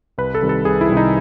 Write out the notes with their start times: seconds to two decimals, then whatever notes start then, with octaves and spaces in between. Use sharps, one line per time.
0.18 C2 B4
0.35 A4
0.42 C3 D#3 G3
0.49 A4
0.65 C2 G#4
0.81 E4
0.89 C3 D#3 G3
0.97 D#4